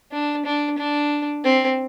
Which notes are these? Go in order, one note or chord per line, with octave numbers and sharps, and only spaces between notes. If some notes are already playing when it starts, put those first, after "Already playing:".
D4
D4
D4
C4